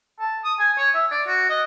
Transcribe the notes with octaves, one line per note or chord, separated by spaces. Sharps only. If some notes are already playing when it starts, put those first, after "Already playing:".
A5
D#6
G#5
C#5
E5
D5
F#4
D#5